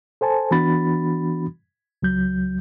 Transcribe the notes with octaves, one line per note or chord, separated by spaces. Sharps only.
A4 C5 G#5 A5
E3 B3 D4 F#4 B5 A6
C#2 F#3 G6